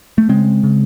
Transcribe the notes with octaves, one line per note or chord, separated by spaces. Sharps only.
A3
C#3 G#3 C4
C#3